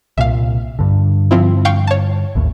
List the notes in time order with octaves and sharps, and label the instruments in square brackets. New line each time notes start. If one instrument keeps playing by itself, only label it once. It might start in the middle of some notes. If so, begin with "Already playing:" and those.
[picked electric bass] C2 A#2 [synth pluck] E5 F5
[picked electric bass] G2 D3
[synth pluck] F3 C4 E4
F5 G5 C#6
C#5 A5
[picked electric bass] A1 D#2 A2